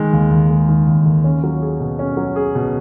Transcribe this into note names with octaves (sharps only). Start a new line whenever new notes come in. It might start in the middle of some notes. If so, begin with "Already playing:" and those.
Already playing: D#3 G#3
D#2
D#2
G#3
D#3
D#2
D#2
C#4
F#3
G#4
B2
C#4
F#3
G#4
B2